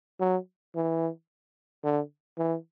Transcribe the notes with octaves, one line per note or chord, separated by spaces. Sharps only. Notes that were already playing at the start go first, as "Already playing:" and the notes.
F#3
E3
D3
E3